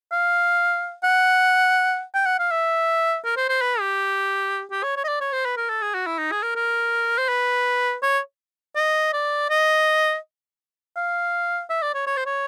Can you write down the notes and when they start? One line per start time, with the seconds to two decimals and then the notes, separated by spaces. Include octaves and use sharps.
0.12 F5
1.04 F#5
2.14 G5
2.26 F#5
2.39 F5
2.51 E5
3.25 A#4
3.37 C5
3.49 C5
3.61 B4
3.80 G4
4.71 G4
4.83 C#5
4.96 C#5
5.04 D#5
5.08 D5
5.21 C#5
5.33 C5
5.45 B4
5.57 A#4
5.69 A4
5.82 G#4
5.94 F#4
6.06 E4
6.18 D#4
6.31 G#4
6.43 A#4
6.55 A#4
7.18 C5
7.29 B4
8.02 C#5
8.76 D#5
9.13 D5
9.50 D#5
10.96 F5
11.70 E5
11.82 D5
11.94 C#5
12.07 C#5
12.17 C5
12.26 C#5